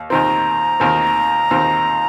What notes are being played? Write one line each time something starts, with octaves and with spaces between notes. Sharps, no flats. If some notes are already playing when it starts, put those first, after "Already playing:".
Already playing: D#2
D#2 D#3 C4 A#5
D#2 D#3 C4
D#2 D#3 C4